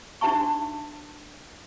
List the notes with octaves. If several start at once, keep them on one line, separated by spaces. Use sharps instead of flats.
D4 D#4 F#4 E5 A5 C#6